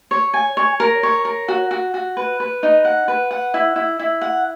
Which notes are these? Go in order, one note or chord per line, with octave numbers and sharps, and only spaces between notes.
C#5
G#5
C#5
A#4
C#5
A#4
F#4
F#4
F#4
B4
B4
D#4
F#5
B4
F#5
E4
E4
E4
F#5